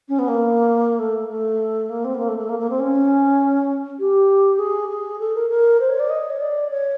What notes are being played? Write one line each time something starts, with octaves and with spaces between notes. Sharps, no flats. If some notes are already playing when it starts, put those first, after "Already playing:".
C#4
B3
A#3
A3
A3
A#3
C4
B3
A#3
A3
A3
A#3
A#3
C4
C#4
G4
G#4
G#4
A4
A#4
A#4
C5
C#5
D5
D#5
C#5
D5
C#5